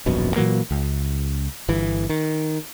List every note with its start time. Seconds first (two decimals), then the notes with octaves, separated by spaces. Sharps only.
0.06 D#1 A#1 F#2 B2
0.36 A#2 E3 F#3 A#3
0.71 C#2
1.68 G1 E3
2.09 D#3